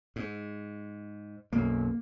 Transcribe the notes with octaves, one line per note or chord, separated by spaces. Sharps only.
G#2
B1 F#2 A#3